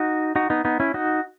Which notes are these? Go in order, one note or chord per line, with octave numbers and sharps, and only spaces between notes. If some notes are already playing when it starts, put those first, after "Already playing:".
Already playing: D#4 F#4
D#4 F#4
B3 D#4
B3 D#4
C#4 E4
D#4 F#4